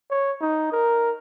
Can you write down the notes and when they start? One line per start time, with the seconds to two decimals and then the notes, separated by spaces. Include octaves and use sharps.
0.10 C#5
0.41 D#4
0.72 A#4